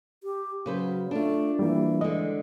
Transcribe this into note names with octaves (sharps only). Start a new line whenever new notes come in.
G4
C#3 F#3 B4 C5
A3 D4 F4
E3 G3 A#3
D3 G#3 D#5